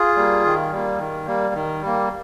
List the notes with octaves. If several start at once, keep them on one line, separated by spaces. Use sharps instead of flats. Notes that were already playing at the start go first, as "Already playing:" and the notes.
Already playing: F4 G#4
G3 A#3
D#3
G3 A#3
D#3
G3 A#3
D#3
G3 A#3